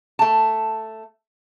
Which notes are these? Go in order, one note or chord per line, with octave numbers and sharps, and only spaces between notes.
A3 A5